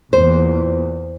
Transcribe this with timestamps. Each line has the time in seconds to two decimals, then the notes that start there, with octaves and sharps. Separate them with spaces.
0.13 E2 A#2 C5